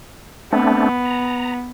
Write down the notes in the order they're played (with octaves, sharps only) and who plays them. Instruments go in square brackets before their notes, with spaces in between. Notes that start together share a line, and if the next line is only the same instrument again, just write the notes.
[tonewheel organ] A3 C4 D4 [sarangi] B3
[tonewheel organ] A#5